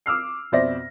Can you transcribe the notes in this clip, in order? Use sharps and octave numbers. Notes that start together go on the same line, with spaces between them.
D6 E6 F6 C7
F2 B2 C5 D5 E5 A#6